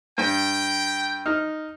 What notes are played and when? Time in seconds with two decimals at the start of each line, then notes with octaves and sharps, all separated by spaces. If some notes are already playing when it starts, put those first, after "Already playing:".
0.18 G2 G5
1.26 D#4 F6